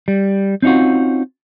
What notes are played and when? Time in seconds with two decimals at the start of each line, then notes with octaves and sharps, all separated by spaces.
0.08 G3
0.62 C4 C#4 D#4 F4 F#4